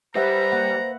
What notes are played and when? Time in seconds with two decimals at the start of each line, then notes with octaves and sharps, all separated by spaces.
0.16 G3 B4 C5 E5 F#5 A#5
0.52 A#3 F#5